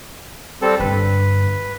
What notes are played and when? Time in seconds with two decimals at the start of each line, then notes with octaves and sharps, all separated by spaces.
0.62 G3 C4 A4
0.80 G2 D3 B4